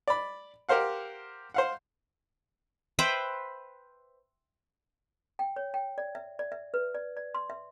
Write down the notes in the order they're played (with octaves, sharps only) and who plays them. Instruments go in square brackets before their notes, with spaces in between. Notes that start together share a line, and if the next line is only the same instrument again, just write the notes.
[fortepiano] D5 B5
G4 A#4 C5 F5 F#5
C5 F5 F#5
[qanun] B4 C5 E5 G5
[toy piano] G5
C#5
G5
D5
E5
D5
E5
B4
D5
D5
C6
E5